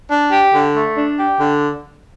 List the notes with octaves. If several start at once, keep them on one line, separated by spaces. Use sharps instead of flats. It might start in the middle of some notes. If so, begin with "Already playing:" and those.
D4
G4
D3
A3
D4
G4
D3